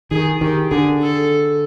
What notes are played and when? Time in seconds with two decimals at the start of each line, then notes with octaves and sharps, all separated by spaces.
0.11 D#3 G#4
0.41 D#3 G4
0.71 D3 G#4
1.02 A4